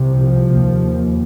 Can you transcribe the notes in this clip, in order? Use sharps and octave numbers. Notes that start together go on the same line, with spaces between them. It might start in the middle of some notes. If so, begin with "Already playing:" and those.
Already playing: C2 C3
F3
D#2